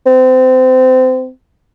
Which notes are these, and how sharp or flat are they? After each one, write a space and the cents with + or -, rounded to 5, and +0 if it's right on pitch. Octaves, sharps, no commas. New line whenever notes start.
C4 -25